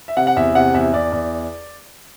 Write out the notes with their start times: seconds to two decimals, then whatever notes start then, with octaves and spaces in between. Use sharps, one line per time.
0.08 E5
0.17 C3 F#5
0.27 F#5
0.36 E2 E5
0.55 C3 F#5
0.74 E2 E5
0.93 E2 D5
1.12 E2